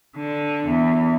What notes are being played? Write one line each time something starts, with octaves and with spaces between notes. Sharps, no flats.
D3
E2